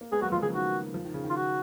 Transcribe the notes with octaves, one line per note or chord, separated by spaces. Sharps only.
A#3
G#3 B3 G#4
F#3 A#3 F#4
F3 G#3 F4
C#3 F3 G#4
D#3 F#4
F3
D#3
C#3
D#3
F4
F#4